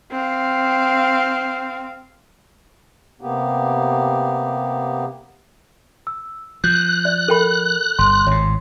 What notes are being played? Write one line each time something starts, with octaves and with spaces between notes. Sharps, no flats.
C4 F5
C3 A#3 B3 G4
E6
F3 F#6 G6
D5
A4 A#4 G5 B5 F#7
G1 C6
G#1 A2 C#5